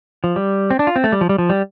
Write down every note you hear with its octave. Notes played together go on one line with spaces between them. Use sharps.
F3
G3
C4
D4
F4
C4
A3
G3
F3
G3
F3
G3